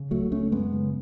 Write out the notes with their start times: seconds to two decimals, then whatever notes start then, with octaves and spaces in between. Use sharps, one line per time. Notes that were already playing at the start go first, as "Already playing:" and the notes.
Already playing: C#3
0.11 C#2 F#3 A3
0.31 C#2 A3 C#4
0.52 F#2 G#3 B3
0.73 C#3